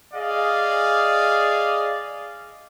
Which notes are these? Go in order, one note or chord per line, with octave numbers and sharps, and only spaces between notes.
G#4 D5 D#5 F5